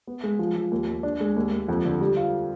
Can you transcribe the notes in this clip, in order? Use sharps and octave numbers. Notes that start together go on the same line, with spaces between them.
B3
G#3
F3
F3
D#2
D#2
D4
G#3
D#2
D#2
F2
D3
G3
F4